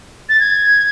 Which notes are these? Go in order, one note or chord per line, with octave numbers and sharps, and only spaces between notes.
A6
G#6